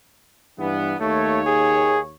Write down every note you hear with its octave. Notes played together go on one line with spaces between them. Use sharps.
G2 E3 B3
D#2 A3 C#5
G#4